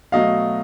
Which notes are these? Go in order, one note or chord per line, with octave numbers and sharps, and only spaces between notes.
B2 F#3 A3 D#5 F5